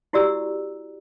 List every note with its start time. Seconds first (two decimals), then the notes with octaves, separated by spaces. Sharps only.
0.13 E4 F#4 G4 D5 A#5 E6